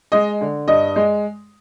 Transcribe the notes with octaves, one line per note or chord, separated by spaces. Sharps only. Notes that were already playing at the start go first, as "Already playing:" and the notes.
G#3 D#5
D3
G2 D#5
G#3